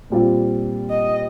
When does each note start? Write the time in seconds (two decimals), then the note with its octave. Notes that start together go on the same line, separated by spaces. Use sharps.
0.10 A#2 G3 C4 F4
0.90 D#5